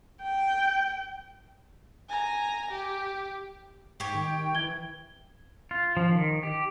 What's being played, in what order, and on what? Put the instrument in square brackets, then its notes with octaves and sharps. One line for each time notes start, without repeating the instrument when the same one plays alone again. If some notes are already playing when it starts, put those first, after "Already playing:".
[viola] G5
[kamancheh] G#5 A#5
G4
[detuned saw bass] G#2 [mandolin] G4 C#5
[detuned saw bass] D#3 [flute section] G5
[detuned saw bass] E3 [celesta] G#6 G7
[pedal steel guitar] F4
F3
D#3
G4